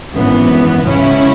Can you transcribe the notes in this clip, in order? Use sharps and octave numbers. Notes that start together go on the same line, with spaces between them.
G#1 F#2 E3 B3
C#2 C#3 F#3 C#4 E4